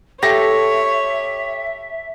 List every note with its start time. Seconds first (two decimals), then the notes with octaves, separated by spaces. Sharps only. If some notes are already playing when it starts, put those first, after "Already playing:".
0.23 G4 A4 C#5 E5 A#6